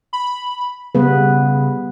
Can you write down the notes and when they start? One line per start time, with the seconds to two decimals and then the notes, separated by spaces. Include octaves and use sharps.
0.13 B5
0.95 C#3 G3 B3 B4